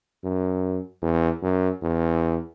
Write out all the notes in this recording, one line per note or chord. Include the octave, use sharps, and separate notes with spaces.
F#2
E2
F#2
E2